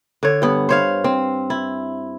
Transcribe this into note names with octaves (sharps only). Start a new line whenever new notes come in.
D3 C#5
G2 B3
C5 C#5 F5
C4
E4